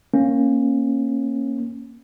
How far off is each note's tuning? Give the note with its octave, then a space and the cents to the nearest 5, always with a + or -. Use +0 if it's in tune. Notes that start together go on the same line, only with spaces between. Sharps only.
A#3 +0 C#4 -20